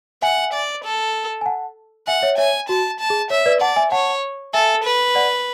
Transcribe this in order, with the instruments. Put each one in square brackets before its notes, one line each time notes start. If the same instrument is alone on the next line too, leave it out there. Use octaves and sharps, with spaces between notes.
[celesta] E5 G#5 [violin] F#5
[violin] D5
A4
[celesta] G#5
F#5 A5
[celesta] E5 G#5 [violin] F#5
[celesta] C#5 E5
[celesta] C#5 E5 [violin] G#5
[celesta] F#4 [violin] A5
[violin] A5
[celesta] G#4
[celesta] C#5 [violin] E5
[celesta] B4 D5
[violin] D5 [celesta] F#5 A5
[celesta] E5 G#5
[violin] C#5 [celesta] F#5 A5
[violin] A4 [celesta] E5 G#5
[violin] B4
[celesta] D5 F#5